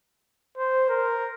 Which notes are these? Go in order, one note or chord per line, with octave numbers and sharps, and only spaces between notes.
C5
A#4